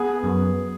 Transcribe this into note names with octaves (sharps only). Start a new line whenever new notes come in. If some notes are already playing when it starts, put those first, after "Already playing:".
Already playing: B3 G#4
F#2